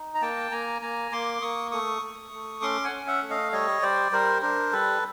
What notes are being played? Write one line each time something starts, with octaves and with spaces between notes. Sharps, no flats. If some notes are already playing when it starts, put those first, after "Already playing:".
Already playing: D#4
A#5
A#3 G5 A5
A#3 G#5 A#5
A#3 G#5 A#5
A#3 C6 D6
A#3 C#6 D#6
A3 C#6 D#6
A3
A3
C#4 C6 D6
F#5 G#5
C#4
E5 F#5
A3
D#5 F5
G3 C#5 D#5
G3 C5 D5
G3 A#4 C5
D4 A#4 C5
G3 A4 B4